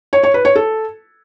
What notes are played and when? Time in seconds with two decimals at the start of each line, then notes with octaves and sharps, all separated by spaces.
0.13 C#5
0.23 C#5
0.34 B4
0.45 C#5
0.55 A4